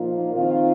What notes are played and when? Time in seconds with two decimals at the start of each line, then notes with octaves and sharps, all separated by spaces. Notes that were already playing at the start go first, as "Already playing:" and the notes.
Already playing: A#2 F3 A#3 D#4 F4
0.34 D#3 C4 D#4 F4